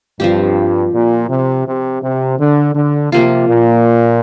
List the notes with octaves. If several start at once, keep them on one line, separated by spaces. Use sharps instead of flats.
G2 F3 C4 G4
A#2
C3
C3
C3
D3
D3
C3 F3 A#3 F4
A#2